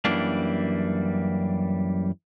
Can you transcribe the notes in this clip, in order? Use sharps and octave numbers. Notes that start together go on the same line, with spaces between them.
F#2 E3 G3 A#3 D4